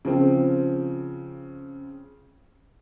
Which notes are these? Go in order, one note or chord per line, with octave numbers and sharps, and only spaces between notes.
C#3 F3 C4